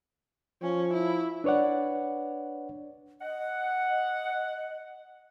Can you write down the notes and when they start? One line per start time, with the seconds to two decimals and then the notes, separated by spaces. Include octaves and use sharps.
0.62 F3 C#4
0.94 E4
1.44 D4 B4 C#5 D5 F#5
3.21 D#5 F#5